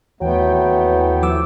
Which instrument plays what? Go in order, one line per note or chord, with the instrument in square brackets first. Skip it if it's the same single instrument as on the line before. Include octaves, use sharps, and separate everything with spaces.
[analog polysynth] D#2 E3 G5 [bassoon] F#3 [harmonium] A3 B3
[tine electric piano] F3 D6 E6